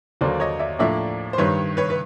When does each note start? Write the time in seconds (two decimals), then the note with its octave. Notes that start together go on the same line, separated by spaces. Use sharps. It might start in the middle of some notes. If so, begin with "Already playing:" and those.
0.21 D#2 D3 F#3 A#3 C5 D5
0.40 C#5 D#5
0.59 D5 E5
0.79 A2 F3 A#3 D4 D5 E5
1.33 C5
1.38 G2 D#3 G3 B4 C#5
1.77 B4 C#5
1.90 B4